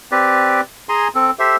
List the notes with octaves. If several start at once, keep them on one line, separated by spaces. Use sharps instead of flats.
C4 G4 B4 D5
G#4 G#5 A#5 C6
C4 A4
G4 A4 C5 E5